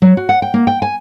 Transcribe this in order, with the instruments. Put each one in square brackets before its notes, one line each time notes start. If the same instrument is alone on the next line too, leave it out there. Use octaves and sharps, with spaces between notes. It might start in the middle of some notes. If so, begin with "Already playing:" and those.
[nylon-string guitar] F#3
F#4
F#5
G5
A#3
G5
G#5